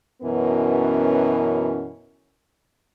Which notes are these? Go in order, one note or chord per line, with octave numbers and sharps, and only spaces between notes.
F#2 B2 E3 B3 C#4 A#4